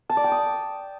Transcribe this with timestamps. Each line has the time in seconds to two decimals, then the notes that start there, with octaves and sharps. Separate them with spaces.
0.09 A5
0.17 D5
0.24 G5
0.32 D#6